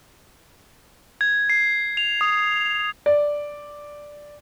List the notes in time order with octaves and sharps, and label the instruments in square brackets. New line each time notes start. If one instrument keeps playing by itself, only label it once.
[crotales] G#6
C7
F7
D#6
[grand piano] D5